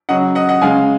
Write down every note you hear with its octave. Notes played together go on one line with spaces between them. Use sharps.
C#3 F#3 D#5 F#5
D#5 F#5
D#5 F#5
C#3 G#3 F5 G#5